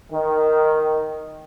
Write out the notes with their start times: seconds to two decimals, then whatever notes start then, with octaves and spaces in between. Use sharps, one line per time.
0.12 D#3